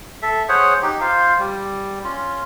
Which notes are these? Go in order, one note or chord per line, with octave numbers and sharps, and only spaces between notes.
A4 E5
G#4 C5 C#5 F#5
D#4 G4
F4 C5 F5
G3
C#4 F4